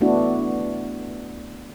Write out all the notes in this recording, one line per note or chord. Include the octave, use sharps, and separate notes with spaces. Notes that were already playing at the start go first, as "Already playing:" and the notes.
A3 B3 D4 E4 F#4